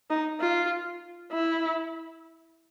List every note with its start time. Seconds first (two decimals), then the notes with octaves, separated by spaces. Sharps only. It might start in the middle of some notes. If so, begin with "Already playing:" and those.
0.10 D#4
0.40 F4
1.32 E4